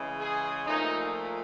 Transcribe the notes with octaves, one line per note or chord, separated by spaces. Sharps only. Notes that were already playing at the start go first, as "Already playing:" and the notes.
Already playing: C#3 E3 G#3
G#4
A#2 F3 A3 D#4